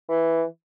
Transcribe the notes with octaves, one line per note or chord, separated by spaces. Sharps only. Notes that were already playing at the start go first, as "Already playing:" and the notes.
E3